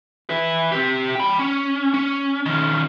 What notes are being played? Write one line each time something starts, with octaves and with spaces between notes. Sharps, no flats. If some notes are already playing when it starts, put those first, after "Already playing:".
E4 B4
C4 G4
G5 B5
C#4
C#4
D#3 C#4